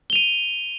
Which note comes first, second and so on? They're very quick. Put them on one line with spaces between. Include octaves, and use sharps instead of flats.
G7 F7 D#7